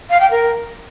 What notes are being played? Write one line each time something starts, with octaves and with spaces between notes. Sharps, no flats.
F5
G5
A#4